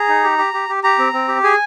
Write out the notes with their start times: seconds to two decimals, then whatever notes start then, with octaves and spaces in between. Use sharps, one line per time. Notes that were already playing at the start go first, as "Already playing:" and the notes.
Already playing: G#4 A#5
0.08 D#4
0.24 G4
0.38 G4
0.54 G4
0.69 G4
0.84 G4 A#5
0.99 C4
1.13 C4
1.28 G4
1.43 G#4 G#5